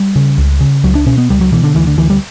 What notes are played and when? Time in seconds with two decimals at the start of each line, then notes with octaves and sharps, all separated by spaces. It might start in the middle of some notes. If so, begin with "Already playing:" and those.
Already playing: G3
0.16 C#3
0.38 C#2
0.60 C#3
0.84 C#2 F#3
0.95 D4
1.07 B2 C#4
1.18 B3
1.30 C#2 G3
1.41 F#3
1.52 B2 E3
1.64 D3
1.75 D2 E3
1.87 D3
1.98 D2 E3
2.10 G3